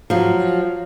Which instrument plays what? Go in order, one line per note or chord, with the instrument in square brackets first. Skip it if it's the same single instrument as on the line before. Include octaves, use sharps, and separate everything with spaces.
[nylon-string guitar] F3 F#3